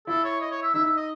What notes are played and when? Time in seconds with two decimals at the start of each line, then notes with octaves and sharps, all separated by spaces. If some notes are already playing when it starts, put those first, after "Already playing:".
0.07 E4 A4
0.24 C#5
0.41 D#5
0.51 C#5
0.62 E5
0.74 D#4 E5
0.85 E5
0.97 D#5